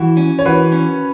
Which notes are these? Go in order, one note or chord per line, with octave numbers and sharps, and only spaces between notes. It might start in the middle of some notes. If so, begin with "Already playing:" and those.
Already playing: E3 F#4
C#4
C#5
E3 F#4 B4
C#4